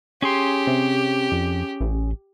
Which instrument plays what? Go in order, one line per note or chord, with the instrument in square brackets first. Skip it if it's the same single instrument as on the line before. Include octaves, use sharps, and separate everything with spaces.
[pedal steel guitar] C#4 G#4 C6 [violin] G4
[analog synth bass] C3
F2
A1